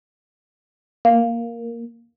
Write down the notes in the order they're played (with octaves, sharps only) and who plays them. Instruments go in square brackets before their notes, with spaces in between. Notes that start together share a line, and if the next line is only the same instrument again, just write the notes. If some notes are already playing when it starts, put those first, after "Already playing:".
[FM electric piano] A#3 [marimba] F5